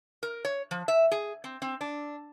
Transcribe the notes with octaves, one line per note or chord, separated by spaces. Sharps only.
A#4
C#5
F3
E5
G#4
C4
C4
D4